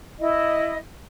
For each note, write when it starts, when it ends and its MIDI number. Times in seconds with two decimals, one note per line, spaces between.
0.20 0.76 64
0.20 0.76 75